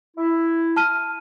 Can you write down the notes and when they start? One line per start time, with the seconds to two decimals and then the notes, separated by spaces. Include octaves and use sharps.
0.16 E4
0.76 A5 F6 D#7